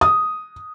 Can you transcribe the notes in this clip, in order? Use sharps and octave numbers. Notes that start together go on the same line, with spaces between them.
D#6